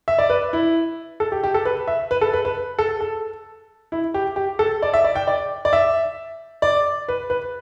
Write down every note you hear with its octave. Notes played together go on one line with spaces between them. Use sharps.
E5
D5
B4
E4
A4
G4
G4
A4
B4
E5
B4
A4
B4
B4
A4
A4
E4
G4
G4
A4
D5
E5
D5
G5
D5
D5
E5
D5
B4
B4